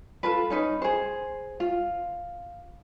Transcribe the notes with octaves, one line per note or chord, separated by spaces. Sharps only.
F4 A4 B4
C#4 D#4 B4
G#4 C5
F4